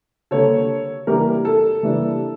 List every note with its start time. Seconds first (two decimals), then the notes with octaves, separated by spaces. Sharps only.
0.31 D3 G3 A#3 A4 C#5
1.07 E3 G3 A#3 D4 G4 A#4
1.45 A4
1.83 E3 G3 A#3 D4